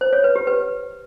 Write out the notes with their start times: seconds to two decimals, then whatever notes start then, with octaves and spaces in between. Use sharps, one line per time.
0.01 C5
0.13 C#5
0.24 B4
0.36 G4
0.47 B4